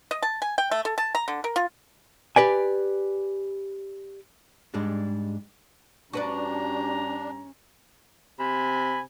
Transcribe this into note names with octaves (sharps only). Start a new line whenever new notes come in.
D#5
A5
G#5
G5
A3
A4
A5
A#5
D3
A#4
F4
G4 B4 D5 G#5
G#2 G3 G#3 D4
G2 C#4 D4 F#4 G4 B4 D5 A#5
C3 G#5 B5